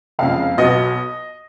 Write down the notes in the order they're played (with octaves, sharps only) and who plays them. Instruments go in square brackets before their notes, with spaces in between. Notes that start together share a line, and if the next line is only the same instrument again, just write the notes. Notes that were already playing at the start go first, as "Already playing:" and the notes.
[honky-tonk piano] F#1 F2 C#3 G#3 F5
B1 B2 F#3 B3 D#5